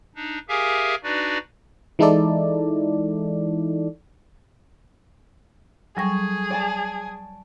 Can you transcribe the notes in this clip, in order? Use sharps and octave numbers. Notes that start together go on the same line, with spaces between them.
D4 D#4
G4 G#4 A#4 E5 F5 G#5
D4 D#4 F#4 B4 D5
E3 G#3 D#4 E4 A4 D5
F#3 G3 G#4 A4 G#5 C#6 A#6
D5 G#5 A5